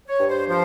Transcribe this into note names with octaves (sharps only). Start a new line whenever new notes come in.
C#5
G2
C5
F3 C5